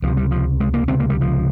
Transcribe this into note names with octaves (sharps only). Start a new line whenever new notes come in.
C#2 C3 F3
G3
F3
G#3
A#3
C#2 C3 C4
A#3
G3
F3